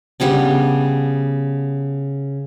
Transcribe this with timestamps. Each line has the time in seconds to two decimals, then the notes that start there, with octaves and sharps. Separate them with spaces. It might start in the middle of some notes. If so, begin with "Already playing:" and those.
0.20 C#3 G3 B3 D4